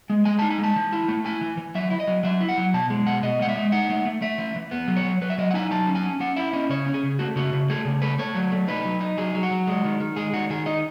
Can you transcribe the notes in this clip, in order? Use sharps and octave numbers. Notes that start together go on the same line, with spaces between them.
G#3
G#3 G#5
D#4 A5
G#5
G#3
A5
E3
E4
A3
E4 G#5
E3
E3
F#3 E5
E4
D#5
F#3
F#3 E5
E4
F#5
F#3
B2 A5
G#3
B2 F#5
B2 D#5
G#3 F#5
E5
G#3
D#4 F#5
A3
A3
A3 E5
E3
E3
B3
F#3
C#5
F#3
F#3 B4
E5
F#3 D#5
F#5
D#4 G#5
F#3 A5
C#4
G#5
C#4
C#4 F#5
E4 E5
C#4 D#5
C#3 C#5
C#4
G#4
C#3
A3 F#4
C#3 F#4
C#3
A3 G#4
C#3
A3 B4
A3 C#5
F#3
A3
D#4 B4
F#3
D#4
F#3 G#4
F#3
F#4
F#3
G#3
D#3
D#3
G#3 G#4
D#3 F#4
D#3 G#4
D#4 D#5